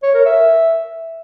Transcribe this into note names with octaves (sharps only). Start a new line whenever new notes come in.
C#5
A#4
E5